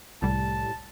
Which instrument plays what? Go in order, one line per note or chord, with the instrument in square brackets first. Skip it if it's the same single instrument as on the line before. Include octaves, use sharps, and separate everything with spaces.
[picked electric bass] C2 [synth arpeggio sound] A2 G3 [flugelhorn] A5